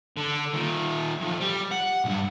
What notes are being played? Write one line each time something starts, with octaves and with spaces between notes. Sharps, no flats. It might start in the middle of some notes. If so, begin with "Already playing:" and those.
D3
A#2 D#3
F2
G3
F#5
B1 G2